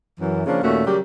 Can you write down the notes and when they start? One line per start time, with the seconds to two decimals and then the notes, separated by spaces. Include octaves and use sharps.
0.20 F#2 E3
0.46 C#3 F3 A#3 C#4 D4
0.63 D#2 A#2 A3 C#4 F#4
0.85 C#3 F#3 G3 G4 A#4